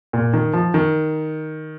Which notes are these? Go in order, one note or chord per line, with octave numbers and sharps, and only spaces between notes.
A#2
D#3
F3
D#3